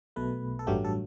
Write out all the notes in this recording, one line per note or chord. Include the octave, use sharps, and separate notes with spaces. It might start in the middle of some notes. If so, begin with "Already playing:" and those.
B1 B2 A3 B4
A4
A1 G2 F#3 A3 G4
A4